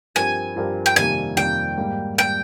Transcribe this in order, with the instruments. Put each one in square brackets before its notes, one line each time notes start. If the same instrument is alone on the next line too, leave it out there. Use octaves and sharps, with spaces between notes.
[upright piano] G2 F3 C4 G4 A#4 [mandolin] G#5
[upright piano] G2 F3 C4 G4 A#4
[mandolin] G5
[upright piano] F2 C3 D#3 G3 A#3 [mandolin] G#5
[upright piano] F2 C3 D#3 G3 A#3 [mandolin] G5
[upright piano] G#2 G3 A#3
[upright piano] G3 A#3 [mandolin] G5